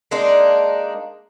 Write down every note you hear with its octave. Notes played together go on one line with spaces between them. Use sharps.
G#3 A#3 D4 D#4